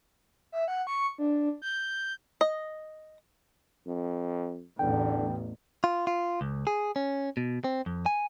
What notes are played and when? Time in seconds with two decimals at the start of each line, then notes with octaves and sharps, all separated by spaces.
0.52 E5
0.68 F#5
0.87 C#6
1.18 D4
1.62 G6
2.41 D#5
3.87 F2
4.79 A1 E2 D3 G5
5.84 F4
6.07 F4
6.41 C#2
6.67 G#4
6.96 C#4
7.37 B2
7.64 C4
7.86 F2
8.06 G#5